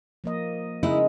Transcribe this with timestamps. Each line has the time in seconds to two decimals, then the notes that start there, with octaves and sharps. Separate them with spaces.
0.24 F3 A#3 D#5
0.83 C#3 G#3 D#4 E4